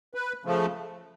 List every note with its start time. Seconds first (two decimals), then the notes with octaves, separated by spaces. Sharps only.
0.14 B4
0.45 C#3 F3 A3